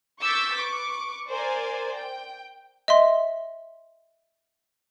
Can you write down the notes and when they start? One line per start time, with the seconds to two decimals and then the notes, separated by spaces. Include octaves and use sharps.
0.21 C#6 D6 E6 G6 A6 B6
0.54 B4 C#6 D6
1.31 A#4 C5 D5 G#5
1.94 G5
2.88 D#5 E5 C6